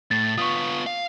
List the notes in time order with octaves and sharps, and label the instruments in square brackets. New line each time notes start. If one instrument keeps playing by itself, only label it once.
[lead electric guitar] A2 [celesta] A6
[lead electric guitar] B3 F4 [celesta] C#6 D#6
[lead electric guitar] F5